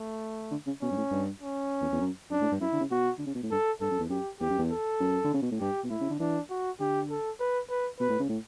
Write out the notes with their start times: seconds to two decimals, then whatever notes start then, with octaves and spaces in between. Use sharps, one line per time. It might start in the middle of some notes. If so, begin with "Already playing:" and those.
Already playing: A3
0.51 D3
0.67 C#3
0.81 B2 C#4
0.91 G2
0.97 A2
1.11 G2
1.42 C#4
1.81 E2
1.92 E2
2.01 F#2
2.31 F#2 D4
2.41 A2
2.52 G2
2.61 F#2 E4
2.73 D3
2.81 C#3
2.91 B2 F#4
3.18 D3
3.26 C#3
3.35 B2
3.43 A2
3.51 G2 A4
3.81 G2 A4
3.91 F#2
4.00 E2
4.10 F#2 G4
4.40 E2 G4
4.50 F#2
4.58 E2
4.71 A4
5.00 F#2
5.25 D3
5.34 C#3
5.42 B2
5.52 A2
5.60 G2 G4
5.84 B2
5.90 A2 E4
6.01 C#3
6.10 D3
6.20 E3 D4
6.50 F#4
6.80 D3 G4
7.10 A4
7.40 B4
7.69 B4
8.00 B2 B4
8.10 A2
8.20 C#3
8.29 A2